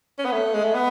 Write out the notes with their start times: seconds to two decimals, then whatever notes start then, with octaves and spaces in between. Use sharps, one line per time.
0.19 C#4
0.25 B3
0.32 A3
0.54 G#3
0.64 A3
0.74 B3